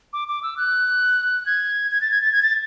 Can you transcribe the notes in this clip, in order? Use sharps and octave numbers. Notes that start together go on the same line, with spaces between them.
D6
D6
E6
F#6
G#6
G#6
A6
G#6
A6
G#6
A6